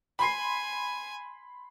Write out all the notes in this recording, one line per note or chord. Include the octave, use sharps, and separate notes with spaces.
G#5 B5 C6 C7